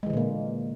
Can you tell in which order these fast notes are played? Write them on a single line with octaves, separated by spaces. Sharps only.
G#3 E3 D3 A#2 A#3